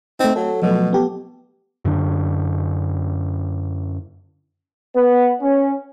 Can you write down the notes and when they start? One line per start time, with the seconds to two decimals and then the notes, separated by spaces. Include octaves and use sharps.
0.20 A3 C4 D#4
0.36 F#3 A4
0.62 B2 F3 F#3 A3
0.93 B3 G4 A4
1.85 F#2 D3 D4
4.96 B3
5.41 C#4